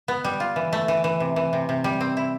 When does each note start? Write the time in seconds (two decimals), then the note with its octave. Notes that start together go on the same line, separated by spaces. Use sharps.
0.08 B3
0.24 G3
0.40 F4
0.56 E3
0.73 A3
0.88 E3
1.04 E3
1.20 C3
1.36 E3
1.53 C3
1.69 C3
1.84 G3
2.01 C4
2.17 E4